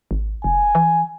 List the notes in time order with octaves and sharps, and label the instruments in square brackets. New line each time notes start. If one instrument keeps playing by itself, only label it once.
[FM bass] G#1
[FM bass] F1 [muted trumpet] G#5
[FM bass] E3